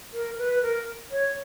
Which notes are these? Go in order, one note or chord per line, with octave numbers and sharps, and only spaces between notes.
A#4
B4
A#4
C#5